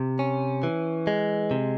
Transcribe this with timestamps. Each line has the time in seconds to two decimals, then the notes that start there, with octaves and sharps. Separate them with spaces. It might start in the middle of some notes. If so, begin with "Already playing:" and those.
Already playing: C3
0.19 C#4
0.63 E3
1.07 G#3
1.51 C3